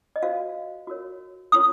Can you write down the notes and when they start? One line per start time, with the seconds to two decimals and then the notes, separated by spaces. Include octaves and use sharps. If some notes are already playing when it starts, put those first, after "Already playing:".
0.16 D#5
0.23 F#4 C5 F5
0.87 F#4 A#4 C#5
1.52 C#4 F4 A#4 C#5 D#6